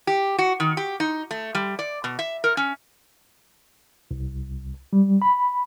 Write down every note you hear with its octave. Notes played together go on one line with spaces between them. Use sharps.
G4
F#4
D#3
G4
D#4
A3
G3
D5
B2
E5
A#4
C#4
C2
G3
B5